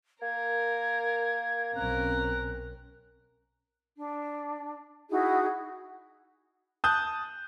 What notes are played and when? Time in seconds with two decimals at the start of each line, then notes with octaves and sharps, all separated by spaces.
0.22 A#3 A#4 G#6
1.76 B1 C4 C#4 A#4 A#5 F#6
3.95 D4
5.09 D#4 E4 F#4 G#4
6.84 A5 D#6 F#6 G6